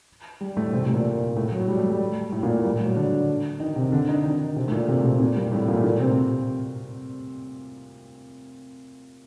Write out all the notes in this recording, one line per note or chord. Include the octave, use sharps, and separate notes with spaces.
G3
A2 A3
C3 C4
C3 C4
A#2 A#3
A2 A3
F#3
G3
A3
G3
A2 A3
A#2 A#3
A2 A3
G3
F#3
D3 D4
D#3 D#4
C3 C4
D3 D4
D#3 D#4
D#3 D#4
C3 C4
A3
A#2 A#3
C3 C4
C3 C4
A#2 A#3
G3
A2 A3
A#2 A#3
A3
A#2 A#3
C3 C4